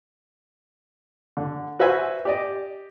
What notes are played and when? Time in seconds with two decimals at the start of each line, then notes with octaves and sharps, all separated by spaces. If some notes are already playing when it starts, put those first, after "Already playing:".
1.37 D3
1.79 F#4 B4 C5 E5 G#5
2.25 G4 D5 D#5